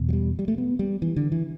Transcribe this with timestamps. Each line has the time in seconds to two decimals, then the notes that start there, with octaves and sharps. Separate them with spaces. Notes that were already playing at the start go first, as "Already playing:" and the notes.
Already playing: E2 B2
0.09 F#3
0.13 G3
0.39 G3
0.48 A3
0.58 B3
0.79 G3
1.02 E3
1.16 D3
1.32 E3